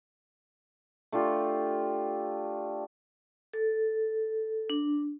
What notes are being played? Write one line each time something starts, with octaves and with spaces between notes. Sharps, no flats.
A3 D4 F4 G4
A4
D4